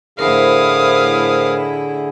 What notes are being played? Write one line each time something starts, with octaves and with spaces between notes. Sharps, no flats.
A2 D3 E4 G#4 A#4 C5 F5 D#6